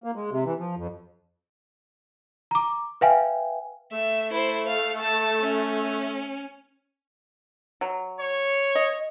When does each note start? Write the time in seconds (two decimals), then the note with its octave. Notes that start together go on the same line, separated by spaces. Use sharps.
0.04 A#3
0.16 G#3
0.31 C3
0.45 E3
0.59 F3
0.77 F2
2.51 A#5 D6
3.01 B4 E5 F5 G5 G#5
3.92 A3 E5
4.31 E4 C5
4.67 F5
5.01 A5
5.40 C#4
7.81 F#3
8.20 C#5
8.75 D#5